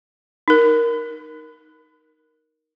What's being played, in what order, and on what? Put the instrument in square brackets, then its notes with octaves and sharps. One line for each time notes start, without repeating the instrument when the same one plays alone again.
[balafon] D#4 A#4